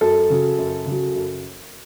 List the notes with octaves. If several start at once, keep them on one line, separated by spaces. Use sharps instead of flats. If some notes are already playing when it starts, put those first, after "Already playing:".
F#2 A4
C#3 F#3
F#2
C#3
F#3
F#2